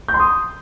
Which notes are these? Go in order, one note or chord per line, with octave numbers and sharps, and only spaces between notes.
G6
C6
D#6